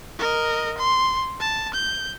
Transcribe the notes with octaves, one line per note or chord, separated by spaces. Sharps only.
A#4 D#5
C6
A5
G6